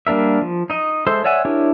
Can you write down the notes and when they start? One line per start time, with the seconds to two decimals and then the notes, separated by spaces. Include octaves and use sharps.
0.07 G3 A#3 D4 A#4 E5
0.42 F3
0.70 D#4 D#5
1.07 G#3 A4 C5 E5 C6
1.24 C#5 D5 E5 F#5 G#5
1.45 D4 E4 G4 A#4 C#5